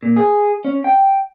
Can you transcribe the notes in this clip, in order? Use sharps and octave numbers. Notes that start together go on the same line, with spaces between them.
A#2
G#4
C#4
G5